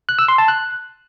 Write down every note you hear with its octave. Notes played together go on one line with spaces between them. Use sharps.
F#6
E6
C6
A5
F#6